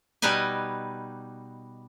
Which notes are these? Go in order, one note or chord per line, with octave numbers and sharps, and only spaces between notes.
B2 G3 D#4 B4 D#5 G#5